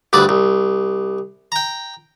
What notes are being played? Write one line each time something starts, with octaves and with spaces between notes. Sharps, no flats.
D2 G2 B4 D5
C2
G5 A#5